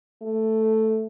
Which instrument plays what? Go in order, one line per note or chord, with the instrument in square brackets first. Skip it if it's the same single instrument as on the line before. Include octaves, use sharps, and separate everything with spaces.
[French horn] A3